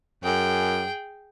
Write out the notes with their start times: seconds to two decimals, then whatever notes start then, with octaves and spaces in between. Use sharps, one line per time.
0.24 F#2 G#4 G5